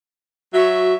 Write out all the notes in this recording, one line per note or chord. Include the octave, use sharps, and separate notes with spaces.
F#3 F#4 C#5 E5